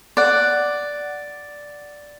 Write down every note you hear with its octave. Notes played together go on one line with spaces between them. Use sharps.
D5 F#5